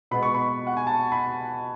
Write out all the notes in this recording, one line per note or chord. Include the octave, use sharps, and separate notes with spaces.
B2 G#3 B3 B5
C#6
B5
F#5
G#5
A5
B5